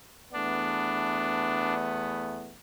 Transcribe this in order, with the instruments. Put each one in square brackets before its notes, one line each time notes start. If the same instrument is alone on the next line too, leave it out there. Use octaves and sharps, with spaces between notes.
[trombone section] E2 A3 B3 [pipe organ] D4